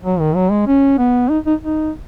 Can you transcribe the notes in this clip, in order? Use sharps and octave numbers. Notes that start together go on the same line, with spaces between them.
F#3
D#3
F#3
G#3
C#4
B3
D#4
D#4
D#4